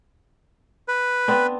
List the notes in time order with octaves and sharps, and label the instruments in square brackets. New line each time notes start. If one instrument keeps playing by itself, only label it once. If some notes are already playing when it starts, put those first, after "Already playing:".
[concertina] B4
[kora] B3 C4 D4